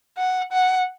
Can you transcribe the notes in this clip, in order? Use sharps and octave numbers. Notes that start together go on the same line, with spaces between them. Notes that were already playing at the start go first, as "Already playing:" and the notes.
F#5
F#5